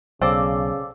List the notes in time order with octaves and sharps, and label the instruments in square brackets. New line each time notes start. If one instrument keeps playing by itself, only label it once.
[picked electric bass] B1 [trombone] C#3 [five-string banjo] C4 A4 D5 [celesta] F5 D6 E6